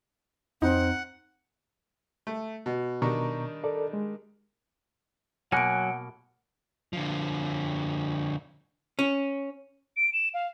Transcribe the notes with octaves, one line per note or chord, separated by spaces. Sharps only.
F2 C4 D#4 F#5
A3
B2
B2 D#3 G3 D4 A#5 C#6
A4 A#4 D5
G#3
B2 F#3 A#3 F#5 G#5 F#6 C#7 D7
D3 F3
C#4
D7
E7
F5